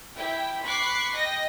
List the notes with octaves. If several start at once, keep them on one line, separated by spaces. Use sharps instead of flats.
E4 G4 G5
B5 C#6 D6 F#6 C7
D#5 G5 A#6